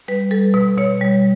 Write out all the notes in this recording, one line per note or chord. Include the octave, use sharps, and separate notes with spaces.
G3 B4
G3 A4
B2 B4
B2 C#5
G3